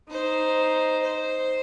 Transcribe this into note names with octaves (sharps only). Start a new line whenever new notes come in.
D#4 C5
C5